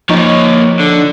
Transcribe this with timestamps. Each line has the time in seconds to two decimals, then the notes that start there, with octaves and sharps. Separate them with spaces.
0.09 F3 A#3 D#4 C#5
0.79 D3